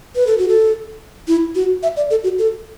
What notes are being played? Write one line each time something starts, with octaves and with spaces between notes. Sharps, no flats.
B4
A4
F#4
A4
E4
F#4
E5
D5
A4
F#4
A4